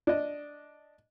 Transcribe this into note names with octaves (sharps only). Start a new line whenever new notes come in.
D4 D#5